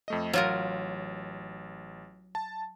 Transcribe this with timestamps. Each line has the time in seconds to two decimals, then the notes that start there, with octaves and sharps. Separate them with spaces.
0.08 F2 A3 D#5
0.33 A1 F#3 F4 A#4
2.35 A5